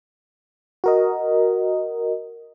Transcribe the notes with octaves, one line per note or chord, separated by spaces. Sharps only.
F#4 A#4 D#5